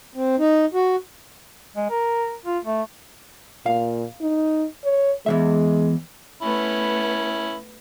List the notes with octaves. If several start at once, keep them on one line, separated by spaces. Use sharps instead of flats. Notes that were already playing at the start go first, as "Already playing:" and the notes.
C4
D#4
F#4
G#3
A#4
F4
A3
A#2 F5
D#4
C#5
E2 C#3 G#3 E5
A3 B3 C#4 E4